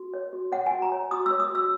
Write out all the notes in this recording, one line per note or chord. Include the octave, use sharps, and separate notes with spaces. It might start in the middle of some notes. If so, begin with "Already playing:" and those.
Already playing: F#4
C#5
F#4
C#5 F#5
G#5
F#4
A#5
C#5
F#4 D#6
C#5 E6
D#6
F#4 E6